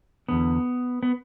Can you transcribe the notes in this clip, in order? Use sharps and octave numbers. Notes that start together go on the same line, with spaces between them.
E2 D3 B3
B3